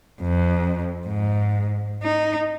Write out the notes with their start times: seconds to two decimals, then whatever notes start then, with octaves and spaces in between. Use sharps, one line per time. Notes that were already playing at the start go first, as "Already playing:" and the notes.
0.21 F2
1.07 G#2
2.03 D#4